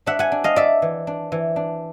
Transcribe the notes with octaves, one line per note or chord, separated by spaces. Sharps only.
D4 E5 F#5
F#5 G#5
D4
D#5 F5
D4 D5 E5
E3
D4
E3
D4